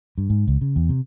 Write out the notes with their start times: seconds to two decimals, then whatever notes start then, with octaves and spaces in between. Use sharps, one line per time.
0.18 G2
0.30 G#2
0.47 C#2
0.61 C#3
0.76 E2
0.89 C3